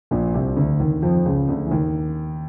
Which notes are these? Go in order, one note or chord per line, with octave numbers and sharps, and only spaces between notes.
A#1 A#2
C2 C3
D2 D3
D#2 D#3
F2 F3
C#2 C#3
D2 D3
E3
D#2 D#3